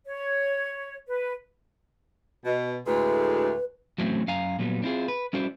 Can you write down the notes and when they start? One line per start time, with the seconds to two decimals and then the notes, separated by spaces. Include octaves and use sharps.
0.06 C#5
1.08 B4
2.45 B2 D#5
2.86 D2 A2 G#3 B4
3.98 E2 A2 F#3 A3 C4 C#4
4.28 F#2 F5 G#5 A#5
4.59 A#2 F#3 G3 B3
4.82 C4 D4 E4 F4 G#4
5.08 B4
5.33 G3 C#4 E4 F#4 C5 D5